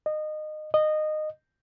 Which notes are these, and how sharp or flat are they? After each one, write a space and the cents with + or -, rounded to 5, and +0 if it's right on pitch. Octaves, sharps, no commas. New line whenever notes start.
D#5 -20
D#5 -15